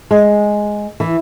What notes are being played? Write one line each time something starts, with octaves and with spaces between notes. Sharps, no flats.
G#3
E3